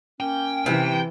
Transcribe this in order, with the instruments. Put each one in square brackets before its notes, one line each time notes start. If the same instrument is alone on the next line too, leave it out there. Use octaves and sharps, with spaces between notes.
[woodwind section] A#3 C#4 [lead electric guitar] G5
[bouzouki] C3 [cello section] E3